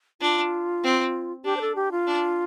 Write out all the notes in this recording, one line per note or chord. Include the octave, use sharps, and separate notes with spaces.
D4 F4
C4
D4 G4
C5
A4
G4
F4
D4